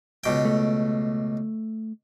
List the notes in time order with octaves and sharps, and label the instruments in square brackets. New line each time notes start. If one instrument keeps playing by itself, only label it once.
[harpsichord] C#2 B2 G5
[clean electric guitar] A3